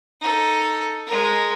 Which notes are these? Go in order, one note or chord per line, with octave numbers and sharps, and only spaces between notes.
D#4 A4
G#3 A#4